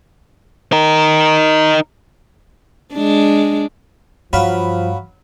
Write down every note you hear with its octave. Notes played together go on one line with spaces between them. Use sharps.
D#4 A#4
G#3 D4
G2 F3 F#3 F5 B5